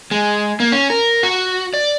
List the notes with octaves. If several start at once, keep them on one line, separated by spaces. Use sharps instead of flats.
G#3
A#3
C#4
A#4
F#4
D5